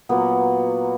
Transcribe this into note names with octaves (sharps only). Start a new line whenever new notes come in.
A#2 F#3 A#3 B3